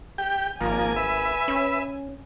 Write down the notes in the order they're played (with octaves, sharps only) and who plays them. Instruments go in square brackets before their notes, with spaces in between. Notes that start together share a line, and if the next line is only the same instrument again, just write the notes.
[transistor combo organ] G4 G5
[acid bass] G#1 [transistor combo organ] F3 A#3 [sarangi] G#5
[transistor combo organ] B4 E5
[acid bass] C#4